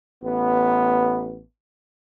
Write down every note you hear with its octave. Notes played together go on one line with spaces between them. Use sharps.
A1 B3